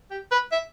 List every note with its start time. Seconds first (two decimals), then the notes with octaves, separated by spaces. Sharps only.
0.11 G4
0.31 B4
0.52 E5